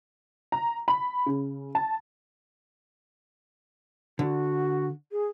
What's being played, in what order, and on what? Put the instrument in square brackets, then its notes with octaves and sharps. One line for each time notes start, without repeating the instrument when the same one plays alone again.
[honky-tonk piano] A#5
B5
C#3
A5
[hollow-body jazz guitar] D3 [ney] F#4
[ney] G#4